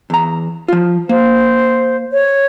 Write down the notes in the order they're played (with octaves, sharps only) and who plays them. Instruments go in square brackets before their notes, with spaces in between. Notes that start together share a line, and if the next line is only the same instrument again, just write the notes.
[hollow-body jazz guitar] E2 A#5
F3 F4
[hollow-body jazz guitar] A#3 [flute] C5
[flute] C#5